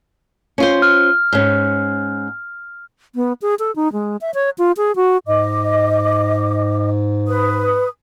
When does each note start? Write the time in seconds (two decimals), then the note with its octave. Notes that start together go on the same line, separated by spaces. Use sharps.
0.58 C#4 F4 C5
0.82 F6
1.33 G#2 C#4
3.15 B3
3.42 G#4
3.59 A4
3.76 D#4
3.93 G#3
4.21 E5
4.34 C#5
4.58 F4
4.77 G#4
4.96 F#4
5.27 G#2 D#5 D6
7.27 B4 D#6